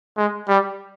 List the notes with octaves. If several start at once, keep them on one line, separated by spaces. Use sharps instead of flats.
G#3
G3